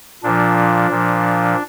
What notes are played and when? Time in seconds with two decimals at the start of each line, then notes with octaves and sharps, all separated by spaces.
0.23 A#2 F3 D4
0.90 A#2 F3